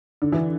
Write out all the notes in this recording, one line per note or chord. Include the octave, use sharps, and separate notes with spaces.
D3
E3